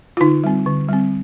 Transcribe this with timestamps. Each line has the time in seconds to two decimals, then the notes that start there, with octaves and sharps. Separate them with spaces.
0.17 F4
0.20 D3 D#4
0.44 G3 C4
0.66 D3
0.89 G3 C4